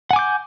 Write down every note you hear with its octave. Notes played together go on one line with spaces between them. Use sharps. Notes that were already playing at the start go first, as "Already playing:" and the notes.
F#5 G#5 D6 G6